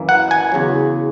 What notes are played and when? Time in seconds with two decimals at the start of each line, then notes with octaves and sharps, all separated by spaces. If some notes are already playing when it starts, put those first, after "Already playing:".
Already playing: F#2 E3 A#3
0.09 F#5
0.31 G#5
0.52 E2 C#3 F#3